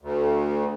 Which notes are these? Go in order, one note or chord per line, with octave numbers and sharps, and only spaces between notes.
D2